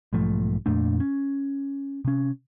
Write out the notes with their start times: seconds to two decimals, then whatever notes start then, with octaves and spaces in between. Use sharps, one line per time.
0.13 B1 G#2 F3 A3
0.66 F2 A#2 A3 D4
1.00 C#4
2.05 C3 C#4